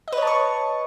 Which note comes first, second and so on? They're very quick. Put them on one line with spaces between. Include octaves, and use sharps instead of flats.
D#5 B4 C#5 A5 C#6